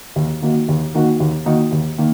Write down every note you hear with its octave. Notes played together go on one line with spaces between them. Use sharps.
D#2
D#3 A#3 D#4 F#4
D#2
D#3 A#3 D#4 F#4
D#2
D#3 A#3 D#4 F#4
D#2
D#3 A#3